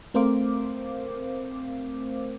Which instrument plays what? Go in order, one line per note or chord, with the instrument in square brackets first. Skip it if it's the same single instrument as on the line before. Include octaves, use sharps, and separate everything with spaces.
[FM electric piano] A3 C4 A#4 C5 F5 D6